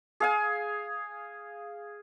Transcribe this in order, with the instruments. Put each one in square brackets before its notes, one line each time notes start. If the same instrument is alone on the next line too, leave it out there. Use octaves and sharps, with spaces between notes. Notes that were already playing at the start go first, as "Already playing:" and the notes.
[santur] G#4 F5 G#5